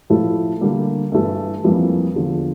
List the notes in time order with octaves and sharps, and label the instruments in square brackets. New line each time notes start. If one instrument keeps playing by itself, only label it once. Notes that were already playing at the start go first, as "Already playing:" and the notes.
[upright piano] A2 F3 A3 E4 A4
D3 G3 A#3
G2 E3 A3 E4
F2 E3 G3 A#3
E2 D3 F3